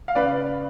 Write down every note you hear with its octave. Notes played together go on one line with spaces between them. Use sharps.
F5
C#3 B4 D5